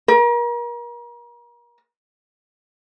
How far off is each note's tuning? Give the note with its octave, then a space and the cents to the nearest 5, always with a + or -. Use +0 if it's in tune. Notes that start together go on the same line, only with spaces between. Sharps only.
A#4 +35